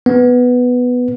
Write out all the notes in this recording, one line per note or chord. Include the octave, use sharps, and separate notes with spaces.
B3